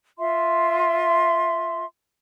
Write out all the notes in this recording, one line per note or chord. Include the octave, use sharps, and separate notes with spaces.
F4 E5 C6